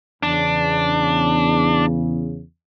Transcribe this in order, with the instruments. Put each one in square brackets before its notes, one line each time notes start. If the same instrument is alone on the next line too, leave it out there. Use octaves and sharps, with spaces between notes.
[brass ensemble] E2 C#3 [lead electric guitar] D4